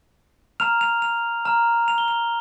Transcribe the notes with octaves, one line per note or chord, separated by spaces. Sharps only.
A#5 F6 F7
F7
F7
A#5 F6
F7
G7
F7